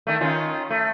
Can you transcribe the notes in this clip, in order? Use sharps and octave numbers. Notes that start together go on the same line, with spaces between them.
D#3 A3
D#3 C#4 F4
A3